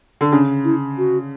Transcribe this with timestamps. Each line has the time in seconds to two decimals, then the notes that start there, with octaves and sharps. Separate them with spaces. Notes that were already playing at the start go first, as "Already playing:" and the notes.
0.21 D3
0.32 C#3 D4
0.64 E4
0.98 F#4